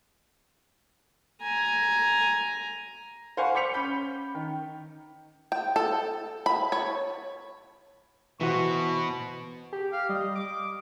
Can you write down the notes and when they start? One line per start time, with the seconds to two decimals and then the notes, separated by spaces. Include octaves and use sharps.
1.42 G#5 A#5
3.37 C5 F5 F#5 G#5 B5 C#6
3.55 D6 G6 B6 C#7 F7
3.74 C#4 B5 G6
4.35 D#3
5.52 G5
5.76 A4
6.46 B5
6.72 C#5
8.41 B2 E3 F#4 C5 C#6
9.73 G4
9.92 F5
10.09 G3 D#5
10.35 D6